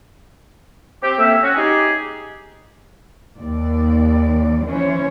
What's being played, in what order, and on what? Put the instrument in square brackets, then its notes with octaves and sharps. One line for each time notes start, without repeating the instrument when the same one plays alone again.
[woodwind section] C4 G4
A3 A#3 C4 C#4 E5
C#4 F#4
D#4 G4 G#4
[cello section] D#2 D5
E3 C#4 C5 C#5